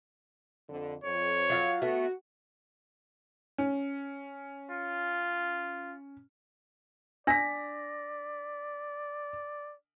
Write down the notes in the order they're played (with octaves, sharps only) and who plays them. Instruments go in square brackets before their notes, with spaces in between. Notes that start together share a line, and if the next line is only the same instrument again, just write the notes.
[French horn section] F2 D3
[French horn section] F2 [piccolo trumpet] C#5
[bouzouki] F#3 F4 F5
[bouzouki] A3 B3 [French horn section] F#4
[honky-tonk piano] C#4
[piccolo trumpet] F4
[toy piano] D4 [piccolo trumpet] D5 [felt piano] A#6 B6